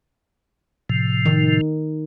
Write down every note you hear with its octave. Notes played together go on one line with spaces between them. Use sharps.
A2 C3 F3
D#3